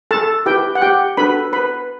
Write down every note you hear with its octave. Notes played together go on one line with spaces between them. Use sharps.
A4 A5
E4 G4 B4 G5
F#5
G4 G5
D4 F#4 A4 B4 B5
B4 B5